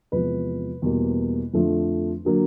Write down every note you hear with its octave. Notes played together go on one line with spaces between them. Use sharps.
E2 C3 F3 G#3 B4
E2 B2 G3 A#3
F2 D3 F3 A3
D3 F#3 A#3